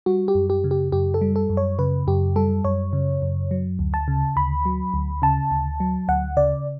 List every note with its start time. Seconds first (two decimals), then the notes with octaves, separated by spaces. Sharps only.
0.06 G3 F#4
0.28 G4
0.35 F#2
0.50 G4
0.64 C#3
0.71 G4
0.92 F#2 G4
1.14 A4
1.21 G3
1.36 A4
1.50 F#2
1.57 C#5
1.79 C#3 B4
2.07 F#2 G4
2.36 G3 A4
2.65 F#2 C#5
2.93 C#3
3.22 F#2
3.51 F#3
3.79 D2
3.94 A5
4.08 C#3
4.36 D2 B5
4.66 F#3
4.94 D2
5.22 C#3 A5
5.51 D2
5.80 F#3
6.08 D2 F#5
6.37 C#3 D5